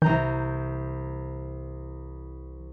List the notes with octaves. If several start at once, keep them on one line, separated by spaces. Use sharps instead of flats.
C2 E3 A#5 G6